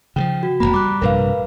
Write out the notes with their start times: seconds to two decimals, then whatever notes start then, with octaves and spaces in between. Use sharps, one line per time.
0.16 C#3 E3 F3 G5
0.43 F#4
0.60 E1 C#2 A#3 A#5 B5
0.74 G3 D6 F#6
1.02 A#1 G2 C3 A#4 B4 F5